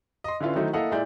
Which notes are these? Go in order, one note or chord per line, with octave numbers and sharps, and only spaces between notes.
D#5 C6
D3 C#4 E4 F4 B4
D#3 F#3 A3 D#4 E4 C5
A#3 E4 A4 D#5 F5 F#5
A#2 G#3 E4 D5 G6